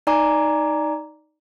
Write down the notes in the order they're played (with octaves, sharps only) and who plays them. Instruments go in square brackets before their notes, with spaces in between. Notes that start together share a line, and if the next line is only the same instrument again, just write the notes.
[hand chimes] D#4 D5 G#5 A#5 D6